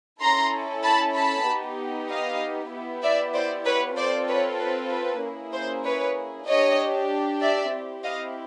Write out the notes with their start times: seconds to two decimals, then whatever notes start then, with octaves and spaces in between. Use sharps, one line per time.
0.21 C#4 E4 A4 A#5 C6
0.84 A5 B5
1.15 A5 B5
1.46 B3 D#4 G4
2.09 D#5 F5
2.72 B3 E4 G4
3.03 D5 E5
3.34 C5 D5
3.65 B4 C#5
3.96 C4 F4 A4 C5 D5
4.28 B4 C#5
4.59 B4
4.90 B4
5.21 A#3 C#4 E4 G#4
5.53 C5
5.84 B4 C#5
6.46 D4 G4 C#5 D#5
7.41 D5 E5
7.73 C4 E4 G4
8.03 D#5 F5